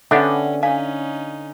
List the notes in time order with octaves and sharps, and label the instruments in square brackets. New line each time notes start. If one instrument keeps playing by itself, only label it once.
[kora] D3 [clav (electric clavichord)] B3 D4 G4 [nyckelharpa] C#4 [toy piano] E5 F#5
[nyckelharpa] C#4 D#4 [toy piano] F5 [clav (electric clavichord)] G#5